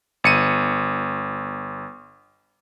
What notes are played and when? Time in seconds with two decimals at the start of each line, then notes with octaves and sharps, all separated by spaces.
0.24 G1 C#7 D#7